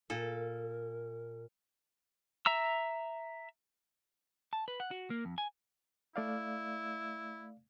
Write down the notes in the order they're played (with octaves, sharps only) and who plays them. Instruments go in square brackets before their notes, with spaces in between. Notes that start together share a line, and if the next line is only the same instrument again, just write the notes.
[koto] A#2 A4 [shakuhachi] A#4
[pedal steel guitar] E5 A#5 E6
[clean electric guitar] A5
B4
F#5
F#4
A#3
F2
G#5
[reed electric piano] A3 D5 F5 [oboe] E4